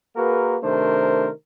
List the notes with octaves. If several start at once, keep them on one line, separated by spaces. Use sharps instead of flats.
A#3 F#4 G#4 A#4 B4
C3 D#3 A3 D4 A#4 C5